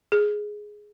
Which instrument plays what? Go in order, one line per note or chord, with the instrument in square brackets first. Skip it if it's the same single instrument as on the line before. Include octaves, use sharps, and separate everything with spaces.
[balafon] G#4